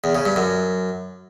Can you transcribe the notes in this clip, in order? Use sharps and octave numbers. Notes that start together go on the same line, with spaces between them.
E2
C#3
G2
F#2